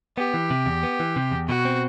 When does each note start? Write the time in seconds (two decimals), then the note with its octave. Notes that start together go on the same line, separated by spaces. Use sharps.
0.18 B3 G4
0.34 E3
0.51 C3
0.66 E2
0.83 B3
1.00 E3
1.16 C3
1.31 E2
1.48 B2 F#4
1.65 C4